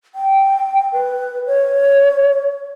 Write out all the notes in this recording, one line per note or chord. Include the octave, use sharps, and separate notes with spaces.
G5
B4
C#5